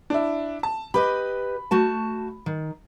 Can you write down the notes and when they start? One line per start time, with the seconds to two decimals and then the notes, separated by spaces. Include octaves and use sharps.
0.10 D4 E4
0.63 A5
0.94 G4 B4 D#5 B5
1.71 A3 F#4 A5
2.46 D#3